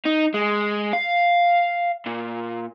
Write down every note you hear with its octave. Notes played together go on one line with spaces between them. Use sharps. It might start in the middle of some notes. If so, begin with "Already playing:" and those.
D#4
G#3
F5
A#2